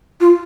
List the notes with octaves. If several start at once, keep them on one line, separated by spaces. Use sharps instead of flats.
F4